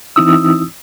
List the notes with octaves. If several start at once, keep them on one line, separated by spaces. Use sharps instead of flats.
E3 C4 D#4 E4 D#6 E6